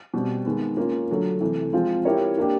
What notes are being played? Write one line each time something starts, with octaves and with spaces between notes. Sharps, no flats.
B2 G3 C4
D#3 G#3 B3
A#3 C#4 F4
D3 F#3 A3
C3 E3 A3
F3 G#3 C4 F4
C4 E4 G4 A#4 C#5
A#3 D4 G4